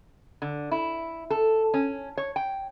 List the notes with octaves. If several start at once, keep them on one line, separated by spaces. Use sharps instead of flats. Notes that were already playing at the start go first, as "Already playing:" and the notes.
D3
E4
A4
C#4
C#5
G5